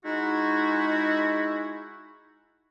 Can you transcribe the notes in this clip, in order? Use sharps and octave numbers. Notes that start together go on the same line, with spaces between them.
G#3 D#4 E4 F#4